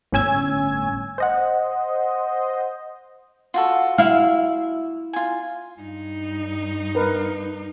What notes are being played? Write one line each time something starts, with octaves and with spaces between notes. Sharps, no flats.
G1 A2 C#4 G#5 E6 G#6
C5 D#5 F#5
F4 F#4 A4
E4 F5
F4 G#5
G2 D#4
A#4 B4